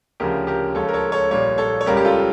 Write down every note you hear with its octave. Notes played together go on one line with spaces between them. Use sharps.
D2 C#3 F3 G4 A#4
G4 A#4
C#2 C#3 F3 A4 C#5
A#4
A4 C#5
A4 C#5
A#1 A#2 G3 C#5
A4 C#5
C#5
C#2 C#3 G3 G4 A#4
G4
F4 A4